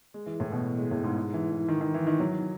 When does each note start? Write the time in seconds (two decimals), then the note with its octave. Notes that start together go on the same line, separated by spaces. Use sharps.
0.14 G#3
0.26 E3
0.40 A2
0.52 B2
0.78 G#3
0.91 A2
1.04 G#2
1.17 G#2
1.34 E3
1.52 E3
1.68 D#3
1.81 D#3
1.94 E3
2.07 D#3
2.20 F#3